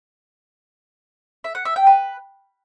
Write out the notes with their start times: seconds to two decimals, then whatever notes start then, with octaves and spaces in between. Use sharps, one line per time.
1.44 E5
1.55 F#5
1.65 E5
1.76 G5
1.87 B4